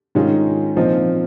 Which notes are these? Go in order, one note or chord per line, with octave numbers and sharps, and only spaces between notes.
G#2 D#3 G#3 C#4 F4
A#2 F3 C4 D#4